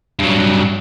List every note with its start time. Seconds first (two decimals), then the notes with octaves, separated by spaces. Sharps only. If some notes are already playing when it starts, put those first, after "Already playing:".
0.19 G2 F#3